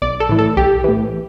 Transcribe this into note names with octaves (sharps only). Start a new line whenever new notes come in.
B1 D5
A4
A2 E3
A4
B1 G4
A2 E3